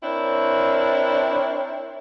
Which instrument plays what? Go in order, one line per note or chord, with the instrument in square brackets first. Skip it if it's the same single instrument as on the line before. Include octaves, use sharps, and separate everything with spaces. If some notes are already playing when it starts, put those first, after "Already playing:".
[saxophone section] C4 D4 E4 A#4 C#5